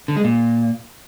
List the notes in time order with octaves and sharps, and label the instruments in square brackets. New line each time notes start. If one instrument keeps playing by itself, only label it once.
[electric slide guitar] D3
G#3
A#2